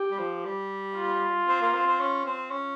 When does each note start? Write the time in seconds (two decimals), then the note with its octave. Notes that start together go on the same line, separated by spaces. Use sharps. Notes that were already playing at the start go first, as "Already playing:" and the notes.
Already playing: G4
0.11 G3
0.19 F3
0.45 G3
0.96 F4
1.48 C4
1.61 A#3
1.73 C4
1.87 C4
2.00 C#4
2.25 C4
2.51 C#4